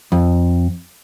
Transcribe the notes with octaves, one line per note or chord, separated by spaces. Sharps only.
F2